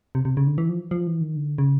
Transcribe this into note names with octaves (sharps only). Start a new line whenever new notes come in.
C3
C3
C#3
D3
E3
F3
F3
E3
D#3
D3
C#3